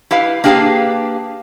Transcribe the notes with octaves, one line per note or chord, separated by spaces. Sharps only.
E4 G4 B4 F5
A#3 D4 G4 G#4 B4 F5